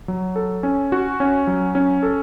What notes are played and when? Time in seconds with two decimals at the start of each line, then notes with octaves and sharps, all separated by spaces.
0.08 F#3
0.36 A4
0.63 C#4
0.92 F#4
1.20 C#4
1.47 F#3
1.75 C#4
2.03 A4